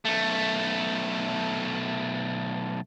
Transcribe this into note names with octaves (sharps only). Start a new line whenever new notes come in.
B1 A3